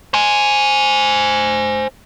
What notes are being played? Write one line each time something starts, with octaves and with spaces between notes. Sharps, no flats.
C5 G#5